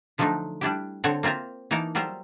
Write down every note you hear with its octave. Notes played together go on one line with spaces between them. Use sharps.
D3 F3 F#3 A3 D4 D#4
G3 D4 E4 G4
D3 C4 A4 C#5 F#5
A#3 C4 F4 E5 A#5
E3 A#3 D#4 A#4 A5 A#5
F#3 G3 F4 C5 E5 A#5